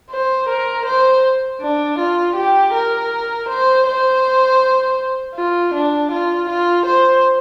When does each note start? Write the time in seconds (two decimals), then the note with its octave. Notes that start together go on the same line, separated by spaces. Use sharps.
0.11 C5
0.49 A#4
0.86 C5
1.61 D4
1.98 F4
2.36 G4
2.74 A#4
3.48 C5
3.87 C5
5.35 F4
5.74 D4
6.11 F4
6.49 F4
6.86 C5